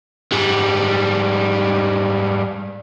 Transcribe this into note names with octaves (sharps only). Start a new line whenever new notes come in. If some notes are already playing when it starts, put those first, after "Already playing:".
G#2 G3